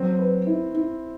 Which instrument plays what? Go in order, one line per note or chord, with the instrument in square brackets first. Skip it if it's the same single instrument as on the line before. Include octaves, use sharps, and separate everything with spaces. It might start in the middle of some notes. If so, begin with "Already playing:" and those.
Already playing: [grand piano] F#3 [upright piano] C4
[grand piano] B4
E4
E4